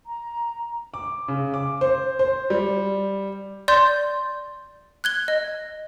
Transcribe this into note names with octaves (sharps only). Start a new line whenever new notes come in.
A#5
D6
C#3
D6
C5
C5
G3
D5 C6 G6
F#6 G#6 G7
D#5